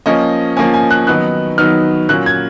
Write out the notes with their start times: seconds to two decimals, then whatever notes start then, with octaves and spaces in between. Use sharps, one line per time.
0.06 F3 A#3 C#4 D#5
0.57 F3 A#3 C#4 G#5
0.74 G#5
0.91 F#6
1.07 D#3 F#3 B3 D#4 F#6
1.58 D#3 F#3 B3 D#4 F6
2.09 A#2 F#3 A#3 C#4 F#6
2.26 G#6